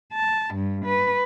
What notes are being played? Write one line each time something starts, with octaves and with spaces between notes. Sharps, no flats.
A5
G2
B4